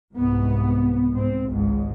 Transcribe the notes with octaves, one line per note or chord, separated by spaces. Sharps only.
C2 G#2 B3
G#2 C4
G#1 C#2 G#2